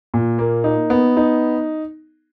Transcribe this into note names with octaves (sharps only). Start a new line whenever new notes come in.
A#2
A#3
D#4
B3
D#4